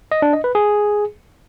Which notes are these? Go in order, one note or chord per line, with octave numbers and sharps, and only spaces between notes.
D#5
D4
D#5
B4
G#4